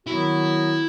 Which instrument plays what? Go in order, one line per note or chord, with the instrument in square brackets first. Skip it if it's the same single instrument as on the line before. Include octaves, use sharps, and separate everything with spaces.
[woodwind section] D#3 F#3 B3 F#4 [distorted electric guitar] E4